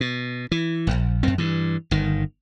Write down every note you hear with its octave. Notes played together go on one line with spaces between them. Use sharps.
B2
E3
D#1 A#1
F#2 C4
G2 E3
G1 D#3